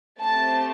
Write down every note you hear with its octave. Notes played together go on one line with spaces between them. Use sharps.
A3 C4 G4 A5